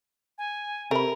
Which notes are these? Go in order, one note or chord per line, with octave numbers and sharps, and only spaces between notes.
G#5
C3 A3 A#4 B5